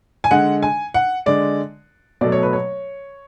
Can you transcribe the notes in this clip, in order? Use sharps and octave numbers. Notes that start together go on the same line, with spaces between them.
G#5
D3 G#3 F#5
G#5
F#5
D3 G#3 D5
B2 F#3 A3 D5
C#5
B4
C#5